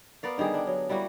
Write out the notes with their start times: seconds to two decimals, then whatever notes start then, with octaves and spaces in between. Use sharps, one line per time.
0.23 B3 A#4 D5 F5
0.38 D3 D#3 G3 G#4
0.54 D4
0.67 F#3
0.89 G3 A#3 E4 F#4